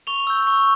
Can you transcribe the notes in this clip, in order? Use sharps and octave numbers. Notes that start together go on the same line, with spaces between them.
C#6 F7 G7
E6 G6
C#6